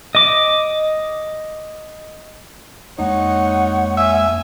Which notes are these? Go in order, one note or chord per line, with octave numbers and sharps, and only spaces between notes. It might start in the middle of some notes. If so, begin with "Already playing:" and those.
D#5 D6
F2 G#3 A#3 D#4 C#5 F#5
E5 G#5